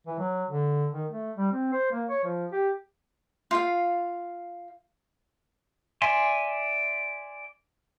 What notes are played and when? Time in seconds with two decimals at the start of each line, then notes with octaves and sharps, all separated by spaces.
0.07 E3
0.19 F#3
0.50 D3
0.94 D#3
1.11 A3
1.36 G3
1.52 C4
1.72 C5
1.92 A#3
2.09 C#5
2.24 F3
2.53 G4
3.51 F4 F5
6.02 D5 E5 G#5 C6